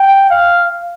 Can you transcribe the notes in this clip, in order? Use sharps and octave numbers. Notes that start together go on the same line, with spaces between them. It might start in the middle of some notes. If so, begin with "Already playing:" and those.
Already playing: G5
F5